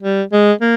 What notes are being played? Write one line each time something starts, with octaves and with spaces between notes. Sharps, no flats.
G3
G#3
A#3